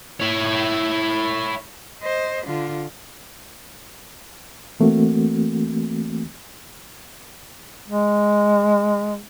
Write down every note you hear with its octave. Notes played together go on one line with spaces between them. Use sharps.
E4 C#5
C5 D#5
D3 F4
E3 A3 A#3 C4 F#4
G#3